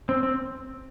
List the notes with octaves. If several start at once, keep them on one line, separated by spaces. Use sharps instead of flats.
C4
C4